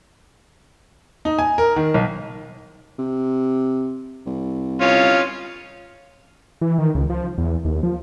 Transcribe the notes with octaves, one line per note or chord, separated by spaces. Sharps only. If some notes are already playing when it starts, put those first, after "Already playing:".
D#4
G#5
A#4
D#3
B1
C3
C2
C#4 F4
E3
D#3
C#2
F3
E2
D#2
F3